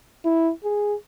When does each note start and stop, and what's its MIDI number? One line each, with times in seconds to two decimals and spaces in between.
0.25 0.52 64
0.64 0.95 68